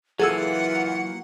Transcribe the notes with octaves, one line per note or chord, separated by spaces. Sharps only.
E3 F#3 A#3 F4 G#4 A4 F#5 E6